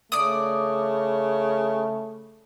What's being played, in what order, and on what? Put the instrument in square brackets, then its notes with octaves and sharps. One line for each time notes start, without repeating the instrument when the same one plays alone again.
[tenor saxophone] C#3 [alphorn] A3 [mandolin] D5 D#6